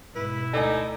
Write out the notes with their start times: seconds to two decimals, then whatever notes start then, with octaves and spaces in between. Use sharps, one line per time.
0.15 G#2 B2 E4 B4
0.53 D2 D#4 A4 D5 G#5